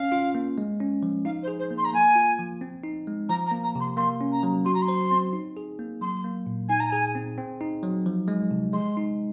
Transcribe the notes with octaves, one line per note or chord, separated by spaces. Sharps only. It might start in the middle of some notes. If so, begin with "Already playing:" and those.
Already playing: C#4 F5
F4
A#3
G#3
C#4
F3
D#4 F5
C5
G#4
C5
A#3
C6
A#5
A#3 G#5
F4
F3
C4
D#4
G#3
F3 A#5
A#5
A#3
A#5
C3
C6
A#3 C6
C#4
A#5
F#3
F#4 C6
A#5
C6
C5
C4
D#4
G#4
A#3
F#3 C6
A#3
A#2
D#4 G#5
A#5
G#4 G#5
C4
C4
D#4
F#3
F3
G#3
C3
G#3 C6
D#4